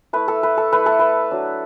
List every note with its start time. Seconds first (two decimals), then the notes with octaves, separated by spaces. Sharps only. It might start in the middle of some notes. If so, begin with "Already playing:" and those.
0.13 A3 E4 B4
0.28 A4
0.43 B4
0.58 A4
0.73 A3 E4 B4
0.86 A4
0.99 B4
1.31 F#3 D4